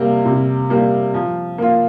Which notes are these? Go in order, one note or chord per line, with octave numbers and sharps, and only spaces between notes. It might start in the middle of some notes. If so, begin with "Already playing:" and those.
Already playing: C3 G3 A#3
C3
G3 A#3
F3
A#3 F4